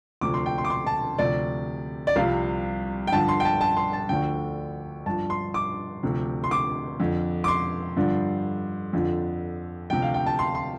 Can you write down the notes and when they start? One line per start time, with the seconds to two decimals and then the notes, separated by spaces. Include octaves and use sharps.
0.21 D2 C3 F3 D6
0.34 C6
0.46 G5
0.58 C6
0.65 D6
0.70 C6
0.87 A5
1.19 D2 C3 F3 D5
2.07 D5
2.16 C2 C3 F3 F5
3.07 G5
3.13 G2 D3 F3 A5
3.29 C6
3.40 G5
3.45 A5
3.61 A5
3.77 C6
3.93 A5
4.09 D2 D3 F3 G5
5.06 G2 F3 A5
5.30 C6
5.54 D6
6.03 D2 C3 F3
6.44 C6
6.51 D6
7.00 F2 D3 F3
7.44 D6
7.48 C6
7.96 G2 D3 F3
8.93 F2 D3 F3
9.90 D2 C3 F3 G5
10.02 F5
10.14 G5
10.26 A5
10.39 C6
10.55 C6